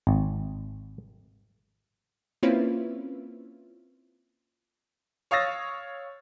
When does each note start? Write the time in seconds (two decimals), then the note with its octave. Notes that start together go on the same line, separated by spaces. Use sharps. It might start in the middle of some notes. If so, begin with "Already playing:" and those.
0.07 G#1
2.43 A#3 C4 C#4 E4 F4 B4
5.31 C#5 F5 D#6 E6 A6 A#6